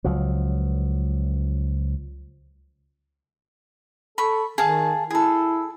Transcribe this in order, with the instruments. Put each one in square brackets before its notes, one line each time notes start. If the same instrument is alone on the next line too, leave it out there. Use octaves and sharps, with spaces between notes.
[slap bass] C#2 F3 F#3
[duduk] A4 [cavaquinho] B5 C#6
[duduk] D#3 [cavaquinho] G#4 F5 A5
[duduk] E4 [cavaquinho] G#4 A4